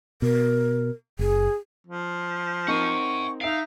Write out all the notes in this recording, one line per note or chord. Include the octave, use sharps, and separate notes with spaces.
B2 A#4
F#1 G#4
F3
C4 D#4 A#4 F#5 G#5 C#6
D#4 E5 F5 D7